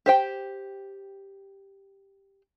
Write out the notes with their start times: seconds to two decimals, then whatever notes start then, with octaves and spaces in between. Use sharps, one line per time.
0.06 G4 C5 G5